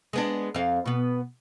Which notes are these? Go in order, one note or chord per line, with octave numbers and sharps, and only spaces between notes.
G#3 B3 D4
F2 F5
B2 B3